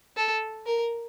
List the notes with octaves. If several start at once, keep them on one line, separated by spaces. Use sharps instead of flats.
A4
A#4